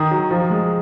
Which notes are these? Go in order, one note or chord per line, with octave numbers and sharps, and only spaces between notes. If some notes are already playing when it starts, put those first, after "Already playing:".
Already playing: D#3 D#6
F#3
F3
G#3